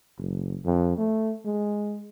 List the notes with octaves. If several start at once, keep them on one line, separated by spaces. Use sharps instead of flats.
F#1
F2
A3
G#3